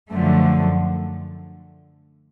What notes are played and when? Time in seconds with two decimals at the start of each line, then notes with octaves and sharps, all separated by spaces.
0.10 F#2 D3 F3 A3